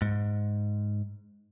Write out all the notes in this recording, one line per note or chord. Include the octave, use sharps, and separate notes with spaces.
G#2